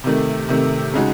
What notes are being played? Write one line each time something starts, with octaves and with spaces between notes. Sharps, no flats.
C3 D#3 A3
C3 D#3 A3
C#3 G#3 D#4 F#4